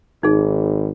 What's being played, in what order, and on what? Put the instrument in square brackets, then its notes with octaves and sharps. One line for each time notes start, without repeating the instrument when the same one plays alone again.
[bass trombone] G#1 [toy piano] D#4 G#4